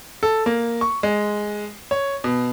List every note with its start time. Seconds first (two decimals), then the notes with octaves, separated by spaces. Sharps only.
0.23 A4
0.46 A#3
0.81 C#6
1.03 G#3
1.91 C#5
2.24 B2